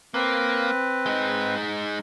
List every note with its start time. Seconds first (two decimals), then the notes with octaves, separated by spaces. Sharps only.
0.14 A#3 C4 B4
1.06 G#3 D#4